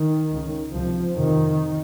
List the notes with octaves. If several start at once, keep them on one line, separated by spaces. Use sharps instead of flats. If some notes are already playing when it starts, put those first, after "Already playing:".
Already playing: D#3
C#2 C#3
C#2 C3 F3
F2 C3 D#3